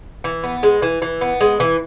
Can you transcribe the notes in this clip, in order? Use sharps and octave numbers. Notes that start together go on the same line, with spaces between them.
E3
B3
G#3
E3
E3
B3
G#3
E3